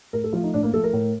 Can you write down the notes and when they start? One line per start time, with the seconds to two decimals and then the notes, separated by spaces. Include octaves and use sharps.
0.13 A2 A#4
0.24 A4
0.33 F3 A3 F4
0.43 D#4
0.54 A2 D4
0.63 A#3
0.73 F3 A3 A4
0.84 A#4
0.93 A2